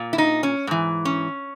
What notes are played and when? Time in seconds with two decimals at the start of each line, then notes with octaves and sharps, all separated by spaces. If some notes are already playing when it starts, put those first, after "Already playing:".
Already playing: A#2
0.13 E4
0.18 D#4
0.43 C#4
0.67 G#2 E3
1.05 C#4